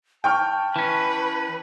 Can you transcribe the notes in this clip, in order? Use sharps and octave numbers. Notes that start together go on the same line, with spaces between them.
G5 A5 C#6 F6
E3 C#4 B4